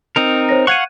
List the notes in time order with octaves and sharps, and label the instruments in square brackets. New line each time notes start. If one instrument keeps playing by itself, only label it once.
[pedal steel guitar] C4 D#4 A#4
[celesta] C5 C#5 A#6
[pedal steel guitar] F5 F#5 C#6 [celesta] F#6 G#6 D#7